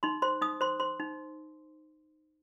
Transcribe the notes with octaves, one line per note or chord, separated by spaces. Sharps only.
D#4 C6
C5 C6
D#4 D#6
C5 C6
C5 C6
D#4